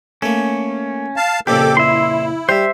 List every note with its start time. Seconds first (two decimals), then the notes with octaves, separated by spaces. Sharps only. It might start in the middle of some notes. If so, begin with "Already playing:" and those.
0.22 A3 A#3 C#4
1.16 F5 A5
1.47 F2 A#2 C#3 G4 A4 D6
1.77 E4 E5 C6
2.49 G3 C5 E5